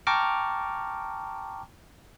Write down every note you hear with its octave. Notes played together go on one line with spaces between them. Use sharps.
G5 A5 A#5 C#6 D6 F6